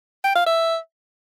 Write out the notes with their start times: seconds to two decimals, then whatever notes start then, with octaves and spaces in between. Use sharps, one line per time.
0.24 G5
0.35 F5
0.46 E5